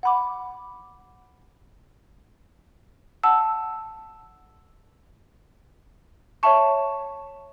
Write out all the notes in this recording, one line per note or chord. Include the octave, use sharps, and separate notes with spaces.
F#5 B5 D6
F#5 A5 E6
C#5 E5 A5 C#6